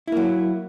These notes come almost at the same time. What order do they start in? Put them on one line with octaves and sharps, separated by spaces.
E4 A#3 F#3